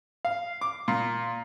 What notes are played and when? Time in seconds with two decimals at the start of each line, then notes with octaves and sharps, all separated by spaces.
0.25 F5
0.61 D6
0.88 A#2